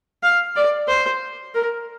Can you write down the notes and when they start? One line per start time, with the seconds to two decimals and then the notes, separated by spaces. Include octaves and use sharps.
0.23 F5
0.56 D5
0.88 C5
1.54 A#4